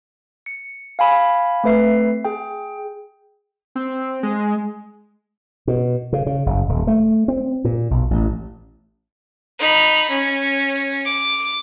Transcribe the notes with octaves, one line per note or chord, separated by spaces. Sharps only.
C#7
F5 G#5 B5
A3 C4 B4 E5 C7
G#4 G5
C4
G#3
B2
C#3
C#3
F#1
D#1
A3
C4
A#2
B1
A1
D#4 B5
C#4
D6